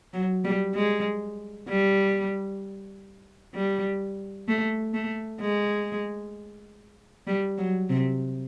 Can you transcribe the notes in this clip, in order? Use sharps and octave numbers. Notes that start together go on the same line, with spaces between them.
F#3
G3
G#3
G3
G3
A3
A3
G#3
G3
F#3
C3